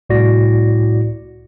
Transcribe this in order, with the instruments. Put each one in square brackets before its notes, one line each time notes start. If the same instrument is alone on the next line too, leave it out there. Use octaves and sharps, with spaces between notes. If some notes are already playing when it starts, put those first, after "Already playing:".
[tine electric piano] C2 A2 E4 F#4 D5 A#6